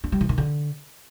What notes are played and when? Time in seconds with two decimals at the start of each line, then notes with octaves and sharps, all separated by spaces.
0.04 D4
0.12 G3
0.21 E3
0.29 D#3
0.38 D3